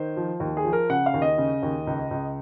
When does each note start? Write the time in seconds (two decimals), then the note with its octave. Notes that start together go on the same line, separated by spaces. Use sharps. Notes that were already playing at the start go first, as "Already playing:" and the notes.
Already playing: D#3 C5
0.17 F3
0.40 D#2
0.57 G#4
0.65 F3
0.73 A#4
0.89 C#3 F#5
1.06 F5
1.14 D#2
1.22 D#5
1.38 C#3
1.63 D#2
1.87 C#2
2.11 C#2